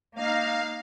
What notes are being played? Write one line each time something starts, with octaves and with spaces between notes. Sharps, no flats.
A#3 D#4 F5